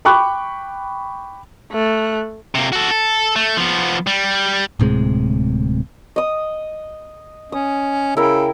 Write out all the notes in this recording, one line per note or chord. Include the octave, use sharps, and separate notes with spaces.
G5 B5 C#6 D6 F#6
A3 F#6
C3 A#3
F#4 A4
A4
A3
F3 B3
G3
D1 A2 C3 G#3
D#5 D#6
C#4 D#6
C#3 E4 A#4 G5